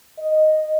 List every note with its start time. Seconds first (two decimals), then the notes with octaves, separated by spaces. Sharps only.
0.19 D#5